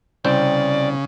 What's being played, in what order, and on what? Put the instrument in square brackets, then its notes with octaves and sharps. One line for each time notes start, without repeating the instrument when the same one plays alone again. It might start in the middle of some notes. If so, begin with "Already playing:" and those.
[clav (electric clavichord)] C2 C4 G5 [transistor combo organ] C#3 [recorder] D5